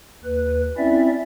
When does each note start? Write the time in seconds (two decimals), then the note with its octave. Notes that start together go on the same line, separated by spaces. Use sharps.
0.24 D#2 B4
0.78 C4 C#4 E4 D5 E5